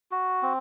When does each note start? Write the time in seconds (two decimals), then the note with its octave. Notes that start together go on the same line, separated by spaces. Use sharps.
0.11 F#4
0.43 C4